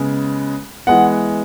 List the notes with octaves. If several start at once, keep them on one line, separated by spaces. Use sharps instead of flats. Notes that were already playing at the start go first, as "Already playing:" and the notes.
Already playing: C#3 G#3 B3
E3 G#3 B3 F#5